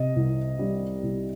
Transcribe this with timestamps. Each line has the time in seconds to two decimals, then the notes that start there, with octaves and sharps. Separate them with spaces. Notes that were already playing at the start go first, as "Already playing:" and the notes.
Already playing: C3 D#5
0.16 C2
0.59 G3
1.03 C2